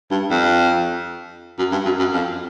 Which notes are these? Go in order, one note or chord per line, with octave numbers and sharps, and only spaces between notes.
G2
F2
F#2
G2
F#2
F#2
F2